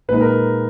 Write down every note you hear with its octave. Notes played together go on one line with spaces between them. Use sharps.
A#2 G#3 D#4 B4
A#4